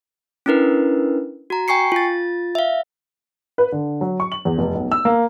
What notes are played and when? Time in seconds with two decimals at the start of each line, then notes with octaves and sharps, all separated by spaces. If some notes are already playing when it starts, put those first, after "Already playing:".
0.46 C#4 D4 E4 A#4 B4
1.50 F#4 A#5
1.68 G5 G#5 C#6 C7 C#7
1.92 F4 A6
2.55 E5 F5
3.58 B4
3.72 D3
4.01 F#3
4.20 C#6
4.32 F#7
4.45 E2
4.58 F1
4.75 B1
4.92 E6
5.05 A#3